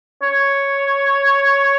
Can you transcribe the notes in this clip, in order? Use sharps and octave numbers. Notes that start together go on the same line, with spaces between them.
C#5